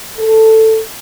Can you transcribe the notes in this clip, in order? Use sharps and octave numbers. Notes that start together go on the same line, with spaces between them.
A4